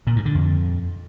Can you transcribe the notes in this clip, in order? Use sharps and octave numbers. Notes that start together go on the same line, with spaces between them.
A#2
G2
D3
F2